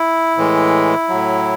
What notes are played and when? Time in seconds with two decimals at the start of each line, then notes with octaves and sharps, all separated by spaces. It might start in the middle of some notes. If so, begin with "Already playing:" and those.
Already playing: E4
0.37 A2 E3 G#3
1.09 A2 F#3